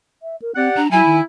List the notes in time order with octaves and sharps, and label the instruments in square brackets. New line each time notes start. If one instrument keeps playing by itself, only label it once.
[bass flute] E5
A#4
[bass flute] C4 [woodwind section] G4 D5 F#5
[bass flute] D4 [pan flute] A#5
[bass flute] F#3 [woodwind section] E4 [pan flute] G#5
[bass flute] D#3